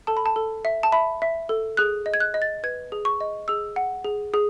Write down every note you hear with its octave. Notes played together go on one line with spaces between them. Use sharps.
A4 A5
B5
A5
A4
E5
A5
E5 B5
E5
A4
G#4 F#6
D#5
G#6
F#6
D#5
A6
B4 G#6
G#4
C#6
D#5
G#4 E6
F#5
G#4
G#4